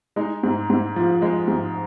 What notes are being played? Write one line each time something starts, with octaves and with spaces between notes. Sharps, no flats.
G#3 D#4
G#2
G#2
F3
G#3
G#2